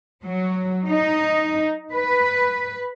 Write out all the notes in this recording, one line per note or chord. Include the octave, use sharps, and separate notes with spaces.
F#3
D#4
B4